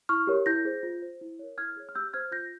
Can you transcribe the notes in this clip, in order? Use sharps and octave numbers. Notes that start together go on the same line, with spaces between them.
E4 C#6 F6
G4 A#4 C#5
E4 G6 A#6
G#4 C5
F4
C5
E4
A#4 C#5
E4 F6 G#6
G#4 C#5
F6
G4 E6 G6
C5 F6 G#6
F4 G6 A#6